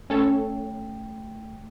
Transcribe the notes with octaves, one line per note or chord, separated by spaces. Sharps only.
A3 C#4 A4 C#5 G5